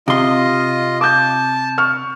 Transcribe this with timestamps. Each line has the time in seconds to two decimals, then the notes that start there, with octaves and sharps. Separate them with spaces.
0.08 C3 F4 D#5 C6
1.01 A5 D6 G6
1.78 C#6 F6